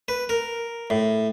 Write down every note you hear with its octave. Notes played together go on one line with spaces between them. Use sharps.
B4
A#4
A2